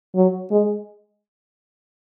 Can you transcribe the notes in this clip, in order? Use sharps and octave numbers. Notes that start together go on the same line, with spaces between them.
F#3
G#3